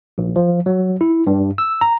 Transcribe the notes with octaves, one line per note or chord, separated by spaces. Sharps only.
A#1
F3
F#3
E4
G2
E6
A#5